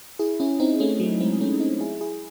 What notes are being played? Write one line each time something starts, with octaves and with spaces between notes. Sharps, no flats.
E4 G#4
C#4 E4
C4 D#4
A3 C#4
F#3 A3
G#3 C4
A3 C#4
C4 D#4
E4 G#4
E4 G#4